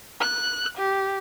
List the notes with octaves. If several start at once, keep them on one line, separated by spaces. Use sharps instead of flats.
F#6
G4